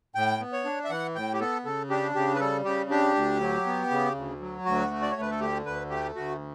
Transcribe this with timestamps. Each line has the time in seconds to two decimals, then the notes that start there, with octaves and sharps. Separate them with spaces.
0.15 A2 G5
0.40 B3
0.53 C#5
0.65 D4
0.84 E5
0.90 E3 F#5
1.15 A2 G5
1.33 G4
1.40 B3 A4
1.65 C#3 A4
1.90 D4 G4
2.15 C#3 G4
2.35 B4
2.40 G3 A4
2.65 C#3 G4
2.90 D4 G4
3.15 D2
3.41 F#3
3.66 B3
3.91 C#3
4.15 D2
4.41 F#3
4.65 D2 F#4
4.90 A3
5.02 D5
5.11 D2 C#5
5.21 B4
5.31 A4
5.40 D3 G4
5.66 D2 B4
5.90 A3 G4
6.15 D2 F#4